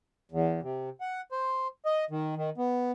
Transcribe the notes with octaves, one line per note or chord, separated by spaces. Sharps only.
E2
C3
F#5
C5
D#5
D#3
D#3
B3